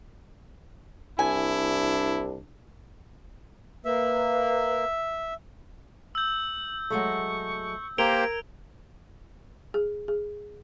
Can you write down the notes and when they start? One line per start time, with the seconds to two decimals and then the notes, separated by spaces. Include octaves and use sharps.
1.19 C2 D4 E4 G#5
3.85 A#3 B4 E5
6.15 E6 G6 F#7
6.90 F#3 G#3 A3 C#6
7.98 A#3 G4 A#4 C5 G#6 D7 F7 G7
9.74 G#4
10.08 G#4